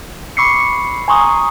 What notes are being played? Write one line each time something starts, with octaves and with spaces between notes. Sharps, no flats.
B5 C#6 D6 E6 C7 C#7
G#5 A#5 C6 C#6 D#6